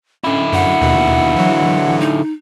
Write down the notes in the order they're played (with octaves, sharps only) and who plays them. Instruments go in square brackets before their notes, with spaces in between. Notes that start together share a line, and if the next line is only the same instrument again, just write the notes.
[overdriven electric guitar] D3 E4 [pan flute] C#4
[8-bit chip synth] F#2 [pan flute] F#5
[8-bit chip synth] D#2 B2
E3 F#3
[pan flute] D#4